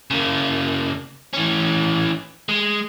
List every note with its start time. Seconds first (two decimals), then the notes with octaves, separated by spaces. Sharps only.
0.11 C#3 A#3
1.33 E3 C#4
2.49 G#3